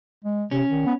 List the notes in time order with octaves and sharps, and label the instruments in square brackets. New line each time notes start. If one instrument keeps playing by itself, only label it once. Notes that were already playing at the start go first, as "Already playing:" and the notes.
[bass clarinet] G#3
[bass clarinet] C3 [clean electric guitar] C#4
[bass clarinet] D#3
B3